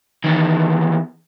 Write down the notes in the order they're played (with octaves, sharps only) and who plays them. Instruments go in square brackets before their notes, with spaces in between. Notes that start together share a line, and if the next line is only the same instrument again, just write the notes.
[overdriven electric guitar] E2 D#3